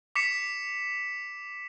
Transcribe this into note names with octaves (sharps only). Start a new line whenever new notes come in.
D6 B6 C#7 E7